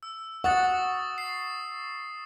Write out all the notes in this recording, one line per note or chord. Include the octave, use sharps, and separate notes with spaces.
E6
F#5 C#6 D#6 A6
C7